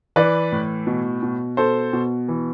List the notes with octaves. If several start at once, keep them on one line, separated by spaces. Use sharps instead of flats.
E3 B4 D5
A2
B2
B2
B2 A4 C5
B2
E3